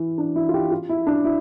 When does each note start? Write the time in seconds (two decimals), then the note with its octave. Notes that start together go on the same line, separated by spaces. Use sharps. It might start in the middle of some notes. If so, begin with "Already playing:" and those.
Already playing: E3
0.18 D4
0.36 E4
0.49 F4
0.54 G4
0.71 F4
0.89 E4
1.07 D4
1.24 E4